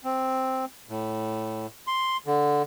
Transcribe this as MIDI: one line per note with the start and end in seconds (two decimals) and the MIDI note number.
0.04 0.65 60
0.89 1.67 45
1.87 2.17 84
2.26 2.63 50